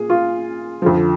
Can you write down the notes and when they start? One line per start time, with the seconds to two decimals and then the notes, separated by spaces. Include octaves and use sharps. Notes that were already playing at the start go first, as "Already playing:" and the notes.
Already playing: A#2 G#4
0.10 F4
0.82 F2 D3 F3